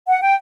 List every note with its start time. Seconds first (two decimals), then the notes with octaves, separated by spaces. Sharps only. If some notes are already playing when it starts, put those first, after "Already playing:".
0.08 F#5
0.21 G5